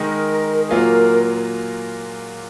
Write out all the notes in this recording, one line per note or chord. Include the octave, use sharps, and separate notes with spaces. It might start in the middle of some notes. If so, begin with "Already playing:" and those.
Already playing: D#3 G#3 D#4 A#4
A#2 F#3 A#3 F4 G#4 A#4